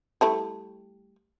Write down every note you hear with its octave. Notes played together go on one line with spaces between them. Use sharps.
G3 A3 E4